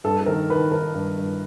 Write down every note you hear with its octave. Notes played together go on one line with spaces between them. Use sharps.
G2 A4
A4
D#3 A#4
D#3 B4
D#3 A#4
G2
G2